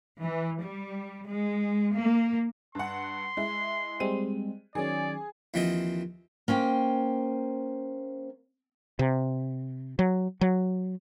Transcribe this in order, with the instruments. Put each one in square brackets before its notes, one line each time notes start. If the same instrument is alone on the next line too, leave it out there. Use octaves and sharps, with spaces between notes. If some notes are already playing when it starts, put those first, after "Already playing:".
[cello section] E3
G3
G#3
A#3
[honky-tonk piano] G2 F#5 [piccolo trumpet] C6
[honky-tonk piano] G#3 E4
[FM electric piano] G3 G#3 C4 [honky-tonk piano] D#7
[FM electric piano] D#3 F#3 C#4 [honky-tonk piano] G#4 [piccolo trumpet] D5
[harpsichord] D#2 E3 F3 C4 F4 D#5
[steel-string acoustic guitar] A#3 C#4 C5 G5
[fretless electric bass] C3
F#3
F#3